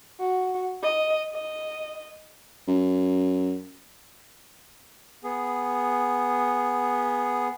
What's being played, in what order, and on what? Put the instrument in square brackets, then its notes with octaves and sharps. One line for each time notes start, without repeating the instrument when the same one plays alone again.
[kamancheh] F#4
D#5
D#5
[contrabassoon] F#2
[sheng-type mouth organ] B3 G#4